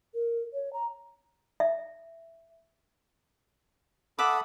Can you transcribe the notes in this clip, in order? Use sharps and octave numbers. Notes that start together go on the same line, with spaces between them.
A#4
C#5
A#5
E5
A4 E5 F#5 B5 D6 D#6